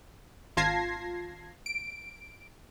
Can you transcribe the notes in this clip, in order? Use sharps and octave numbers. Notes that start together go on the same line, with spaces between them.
G#1 F4 A5 G#6 A#6 C7
D7